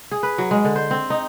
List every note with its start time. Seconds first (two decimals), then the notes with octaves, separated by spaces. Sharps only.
0.11 G#4
0.23 B4
0.38 F#3
0.51 G#3
0.65 D3
0.76 C5
0.91 C4
1.10 D#4